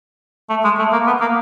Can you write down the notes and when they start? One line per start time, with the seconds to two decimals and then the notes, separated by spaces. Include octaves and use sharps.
0.50 A3
0.64 G#3
0.79 A3
0.92 A#3
1.07 B3
1.21 A#3